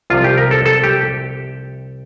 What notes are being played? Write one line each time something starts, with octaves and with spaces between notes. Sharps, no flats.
C2 C3 F3 F4
G4
A#4
A4
A4
G4